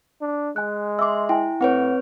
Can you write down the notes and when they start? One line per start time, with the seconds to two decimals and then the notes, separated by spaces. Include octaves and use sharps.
0.21 D4
0.56 G#3 G#5 F#6
0.99 E5 C6 D6 E6
1.29 E4 G5 G#5
1.61 A2 C4 B4 C#5 F#5